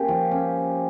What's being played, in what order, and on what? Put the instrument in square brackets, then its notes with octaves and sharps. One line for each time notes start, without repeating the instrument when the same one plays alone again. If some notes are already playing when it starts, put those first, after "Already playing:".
Already playing: [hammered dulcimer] A#3 C#4 G4
F3
C#4